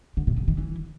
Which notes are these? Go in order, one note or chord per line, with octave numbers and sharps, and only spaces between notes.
D3
B2
C#3
D#3
E3